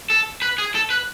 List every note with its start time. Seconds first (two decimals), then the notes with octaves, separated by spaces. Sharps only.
0.10 A4
0.42 B4
0.58 G#4
0.75 A4
0.90 B4